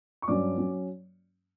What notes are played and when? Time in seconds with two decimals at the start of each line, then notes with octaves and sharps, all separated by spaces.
0.22 C#6
0.28 G2 F#3 C#4 D5 D6
0.58 F#3 C#4